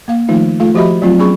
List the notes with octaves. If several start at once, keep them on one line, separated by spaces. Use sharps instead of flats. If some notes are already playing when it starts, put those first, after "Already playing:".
A#3 F5
D#3 F3 A3 D#4 F4
A3 F4 A4 F5
F3 F#4 G4 D#5 E5 B5
F#3 A3 C4 F4
F#3 B3 C#4 G#4 B5 C#6